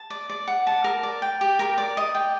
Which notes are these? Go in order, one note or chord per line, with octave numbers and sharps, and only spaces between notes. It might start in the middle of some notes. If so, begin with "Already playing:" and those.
Already playing: A5
D5
D5
F#5
A5
A#4
D5
G5
G4
A#4
D5
D#5
G5